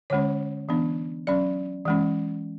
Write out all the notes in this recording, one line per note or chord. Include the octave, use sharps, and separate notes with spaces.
D3 G#3 C#4 C#5
E3 B3 D4
F#3 C#4 D5
E3 G#3 C#4